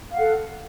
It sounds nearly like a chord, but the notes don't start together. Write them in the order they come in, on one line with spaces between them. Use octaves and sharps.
F5 F#5 A4